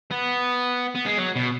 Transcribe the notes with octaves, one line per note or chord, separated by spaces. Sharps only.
B3
B3
G#3
F#3
B2